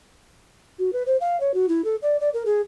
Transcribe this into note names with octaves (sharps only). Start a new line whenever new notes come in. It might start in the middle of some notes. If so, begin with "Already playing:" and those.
F#4
B4
C5
F5
C#5
F#4
E4
A4
D5
D5
A#4
G#4